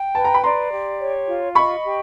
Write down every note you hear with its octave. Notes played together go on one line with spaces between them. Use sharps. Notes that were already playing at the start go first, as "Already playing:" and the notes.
Already playing: G5
B4 A5
A#5
B5
D5 A#5 C6
G4
C#5
F4
D#5 B5 C#6
G4